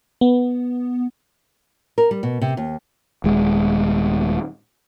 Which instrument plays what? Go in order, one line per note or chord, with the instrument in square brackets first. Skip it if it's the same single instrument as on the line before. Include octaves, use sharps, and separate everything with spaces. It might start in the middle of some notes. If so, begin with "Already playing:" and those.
[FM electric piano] B3
[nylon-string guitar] A#4
G3
B2
C3
D#2
[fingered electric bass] D#1 G#3